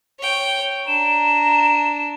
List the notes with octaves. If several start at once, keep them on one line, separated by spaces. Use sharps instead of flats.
C#5 G5
D4 A#5 E7